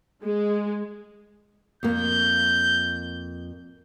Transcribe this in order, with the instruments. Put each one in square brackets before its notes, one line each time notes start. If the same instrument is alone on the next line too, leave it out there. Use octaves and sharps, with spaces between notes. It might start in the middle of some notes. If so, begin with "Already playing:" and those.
[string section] G#3
[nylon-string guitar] F2 A#3 [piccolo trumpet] G6